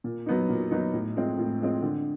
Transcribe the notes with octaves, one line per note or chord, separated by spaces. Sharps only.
A#2
F#3 B3 D#4
A#2
F#3 B3 D#4
A2
F3 G#3 C4
A2
F3 G#3 C4
D3